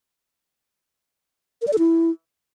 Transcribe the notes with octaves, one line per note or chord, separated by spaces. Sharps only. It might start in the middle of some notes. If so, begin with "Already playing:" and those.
A#4
D5
A4
E4